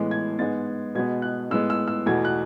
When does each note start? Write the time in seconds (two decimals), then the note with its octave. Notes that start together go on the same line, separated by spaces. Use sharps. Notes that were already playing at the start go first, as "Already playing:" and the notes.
Already playing: A2 E3 G#3 B3
0.11 G#6
0.39 G#2 G#3 B3 A6
0.95 B2 G#3 B3 G#6
1.22 F#6
1.51 A2 G#3 B3 E6
1.70 E6
1.88 E6
2.06 E2 B2 A3 G#6
2.25 F#6